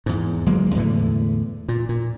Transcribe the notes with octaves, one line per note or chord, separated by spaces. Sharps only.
E2 G#2
G1 F#3 G#3 A#3
E2 A2 D3 E3
A#2
A#2